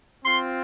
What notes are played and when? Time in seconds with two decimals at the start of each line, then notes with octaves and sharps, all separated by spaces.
0.24 C4 F4 C6